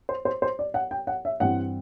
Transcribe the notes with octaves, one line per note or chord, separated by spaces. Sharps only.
C5
C5
C5
D5
F#5
G5
F#5
E5
G2 E3 G3 C4 F#5